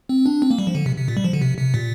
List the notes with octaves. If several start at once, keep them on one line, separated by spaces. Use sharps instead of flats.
C4
D4
C4
A#3
G3
F3
D3
C3
C3
A#2
G3
F3
D3
C3
C3
A#2